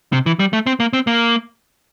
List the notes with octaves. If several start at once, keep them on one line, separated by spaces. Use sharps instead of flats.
C3
E3
G3
A3
C4
A#3
C4
A#3